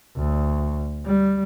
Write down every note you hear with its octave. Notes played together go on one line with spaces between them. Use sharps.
D2
G3